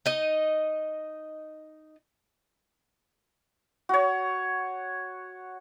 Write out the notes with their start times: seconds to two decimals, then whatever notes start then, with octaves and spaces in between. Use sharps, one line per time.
0.06 D#4 D#5
3.89 F#4 C#5